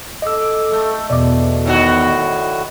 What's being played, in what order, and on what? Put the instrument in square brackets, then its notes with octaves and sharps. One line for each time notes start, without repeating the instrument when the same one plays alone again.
[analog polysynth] A4 D6 [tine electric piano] D#5 E6
[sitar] A3
[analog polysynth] E2 B2 [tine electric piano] D5 D#5 D6
[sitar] A2 D#3 F#4